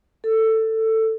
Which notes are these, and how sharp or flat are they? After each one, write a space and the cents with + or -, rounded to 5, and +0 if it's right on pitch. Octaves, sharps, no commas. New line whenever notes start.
A4 +15